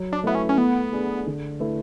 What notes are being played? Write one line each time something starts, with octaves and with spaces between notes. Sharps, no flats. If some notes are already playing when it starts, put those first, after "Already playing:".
Already playing: F#3
D4
A3 B3 E4 B4 E5
C#4
C#4
A3 B3
D4 G#4
D3
A3 E4 B4